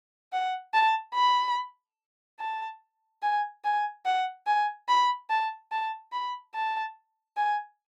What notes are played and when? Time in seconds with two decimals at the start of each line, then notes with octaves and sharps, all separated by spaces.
0.33 F#5
0.74 A5
1.14 B5
2.40 A5
3.22 G#5
3.64 G#5
4.05 F#5
4.47 G#5
4.88 B5
5.30 A5
5.72 A5
6.12 B5
6.55 A5
7.37 G#5